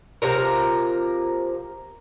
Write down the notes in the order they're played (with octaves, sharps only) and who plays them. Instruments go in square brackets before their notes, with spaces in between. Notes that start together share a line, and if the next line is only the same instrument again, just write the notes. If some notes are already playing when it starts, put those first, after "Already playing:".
[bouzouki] C3 F3 A#3 A#4 A#5